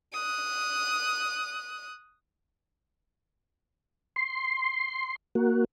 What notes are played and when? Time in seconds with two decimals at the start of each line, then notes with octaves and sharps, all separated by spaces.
0.13 D#6 F#6
4.16 C6
5.35 A#3 F#4